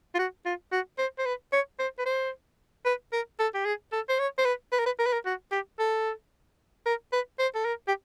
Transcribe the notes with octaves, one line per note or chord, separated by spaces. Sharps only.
F4
F#4
F4
F#4
C5
C5
B4
C#5
C5
B4
C5
B4
A#4
A4
G4
G#4
A4
C5
C#5
C5
B4
B4
A#4
B4
A#4
B4
A#4
F#4
G4
A4
A#4
B4
C5
A4
A#4
G4